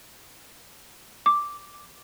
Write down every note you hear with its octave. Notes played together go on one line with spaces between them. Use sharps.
D6